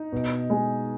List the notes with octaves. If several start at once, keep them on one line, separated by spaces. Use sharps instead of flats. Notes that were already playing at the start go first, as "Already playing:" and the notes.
Already playing: D#4
B2
G#3